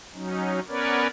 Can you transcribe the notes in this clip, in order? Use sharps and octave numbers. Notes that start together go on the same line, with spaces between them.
F#3 C#4 D#4
B3 C#4 A#4 B4 C#5 D5